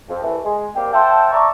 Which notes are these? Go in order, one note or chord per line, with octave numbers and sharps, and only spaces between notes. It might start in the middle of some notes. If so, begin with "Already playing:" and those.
F2
C2 E3 A3
G#3
G3 A#3 C4 G4
C5 E5 F#5 G5 A5
D5 E5 A5 A#5 C#6